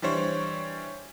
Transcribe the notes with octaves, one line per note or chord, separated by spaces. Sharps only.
E3 G3 D4 C5 C#5